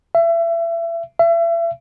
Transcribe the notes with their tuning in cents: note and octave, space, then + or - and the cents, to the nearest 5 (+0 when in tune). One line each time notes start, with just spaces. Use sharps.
E5 +30
E5 +35